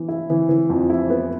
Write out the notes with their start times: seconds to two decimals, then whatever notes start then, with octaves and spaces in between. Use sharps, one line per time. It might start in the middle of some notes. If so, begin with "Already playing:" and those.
Already playing: E3 B3
0.08 E4
0.30 E3
0.49 E3
0.70 F2
0.90 E4
1.10 B3